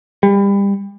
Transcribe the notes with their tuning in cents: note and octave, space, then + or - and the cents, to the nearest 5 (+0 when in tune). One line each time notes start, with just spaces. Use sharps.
G3 +30